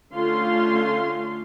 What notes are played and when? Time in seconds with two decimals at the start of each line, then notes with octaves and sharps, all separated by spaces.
0.13 D3 A3 C#4 F4 F5 C6